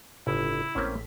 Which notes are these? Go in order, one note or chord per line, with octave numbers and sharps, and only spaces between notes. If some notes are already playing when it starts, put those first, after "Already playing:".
G1 A2 C#3 E4
A1 A2 A#3 C4 C#4 B6